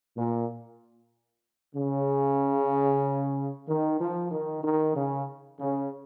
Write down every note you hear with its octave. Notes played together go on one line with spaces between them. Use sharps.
A#2
C#3
D#3
F3
D#3
D#3
C#3
C#3